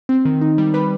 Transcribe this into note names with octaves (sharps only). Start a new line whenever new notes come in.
C4
D#3
D#4
G3
G3 B4 B5